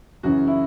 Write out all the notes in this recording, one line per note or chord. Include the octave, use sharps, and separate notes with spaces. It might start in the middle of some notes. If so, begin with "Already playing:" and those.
F#2 C#3 E3 F#4
E4